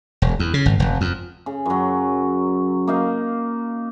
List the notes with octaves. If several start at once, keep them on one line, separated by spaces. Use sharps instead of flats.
E1
E2
C#3
G#1
F1
F2
C#3
F#2 F#3
A#3 D#4 F5